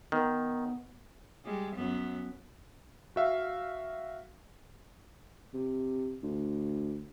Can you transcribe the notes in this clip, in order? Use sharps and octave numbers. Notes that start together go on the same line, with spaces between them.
D#3 B3
G3 G#3
F#2 B3
F#4 E5 F5
C3
D2